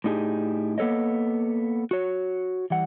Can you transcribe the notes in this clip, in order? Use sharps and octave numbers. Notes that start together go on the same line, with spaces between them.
A2 D4 D#4 G4 G#4
A#3 B3 A4 C#5 D#5
F#4 C#5
E3 G3 F#5